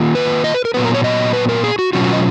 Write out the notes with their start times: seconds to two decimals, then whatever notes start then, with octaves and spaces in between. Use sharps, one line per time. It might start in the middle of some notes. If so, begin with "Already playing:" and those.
Already playing: D#3 A#3 F4
0.15 B4
0.44 D#5
0.54 B4
0.65 A#4
0.74 A#2 F#3 B3 B4
0.85 A#4
0.94 C#5
1.04 D#5
1.33 B4
1.49 A#4
1.64 G#4
1.79 F#4
1.93 B2 F#3 C#4 F4 F#4
2.04 F#4
2.13 D#5